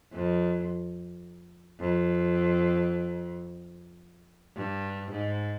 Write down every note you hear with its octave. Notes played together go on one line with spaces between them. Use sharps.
F2
F2
G2
G#2